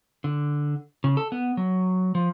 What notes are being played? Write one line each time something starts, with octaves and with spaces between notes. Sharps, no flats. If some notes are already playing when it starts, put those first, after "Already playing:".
D3
C#3
A4
B3
F#3
F3